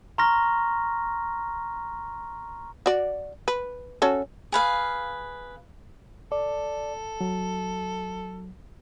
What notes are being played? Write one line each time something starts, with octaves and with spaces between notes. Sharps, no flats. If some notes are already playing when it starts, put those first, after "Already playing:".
A#5 C6 C#6 F6 A#6
F#4 D5
B4
C#4 F#4 A4
G#4 B4 F5
A4 D5
F#3